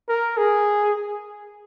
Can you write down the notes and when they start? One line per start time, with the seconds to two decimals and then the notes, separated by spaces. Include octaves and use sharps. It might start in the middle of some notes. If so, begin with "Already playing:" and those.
0.09 A#4
0.37 G#4